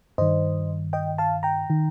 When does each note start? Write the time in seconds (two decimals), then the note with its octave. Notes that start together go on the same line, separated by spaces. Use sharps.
0.18 G2 D#3 C5 D#5
0.93 D#5 G5
1.18 F5 A5
1.43 G5 A#5
1.70 D#3